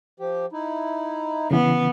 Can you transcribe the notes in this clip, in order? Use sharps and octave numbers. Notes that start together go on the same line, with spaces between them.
F3 G4
D#4 E4
C#3 E3 B3